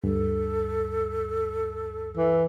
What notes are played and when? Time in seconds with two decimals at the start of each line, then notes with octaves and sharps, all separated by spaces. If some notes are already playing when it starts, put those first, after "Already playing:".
0.04 D2 G2 A4
2.17 E3